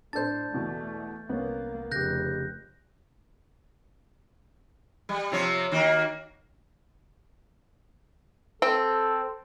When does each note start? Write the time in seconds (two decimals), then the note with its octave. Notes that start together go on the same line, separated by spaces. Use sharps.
0.13 A2 D4 A4 C5 D5 A5 G6 A6
0.54 E2 B2 A3 B3
1.29 C2 A#3 B3 C#4
1.91 F1 C#3 G4 F#6 G6 A#6
5.09 G3
5.32 C3 F3 C#5
5.72 D#3 A#3 F#4
8.62 C4 A4